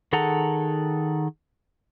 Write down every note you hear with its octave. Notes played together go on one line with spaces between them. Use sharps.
D#3 G#4 A4 F#5 A#5